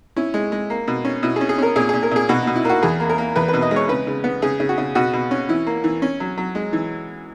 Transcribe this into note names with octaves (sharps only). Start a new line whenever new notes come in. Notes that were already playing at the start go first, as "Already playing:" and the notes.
C#4 E4
G#3
G#3
A#3
B2
C#4
B2 E4
G#4
C#4
G#4
C#4 A#4
A#2 G#4
A#2 G#4
A#4
A#2 G#4
B2 F#4
B2 D#4
E4
A#3 F#4
E2 G#4
A#3
A#4
A#3
E2 B4
B4
B2
D#5
G#3
C#5
C#3 B4
C#3
B3
C#3 G#4
C#3
F#4
C#3
B2 F#4
B2
C#4
E3 E4
A#3
E3
C#4
F#3
F#3
G#3
E3